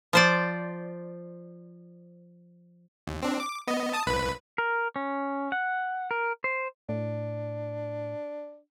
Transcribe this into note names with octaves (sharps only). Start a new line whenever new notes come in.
F3 C5 D5
D#2
C4 D4
D6
B3 D#5
A5 D#6
C2 B4 B5
A#4
C#4
F#5
A#4
C5
A2 D4